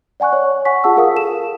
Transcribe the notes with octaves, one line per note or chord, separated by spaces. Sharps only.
D5 F#5 G#5 C#6 F#6
C#5 D5
F#5 G#5 C#6 B6
F4 G#4 F#5 A5 E6
F4 G#4 A#4 F5 F#5 D#6
A4 E7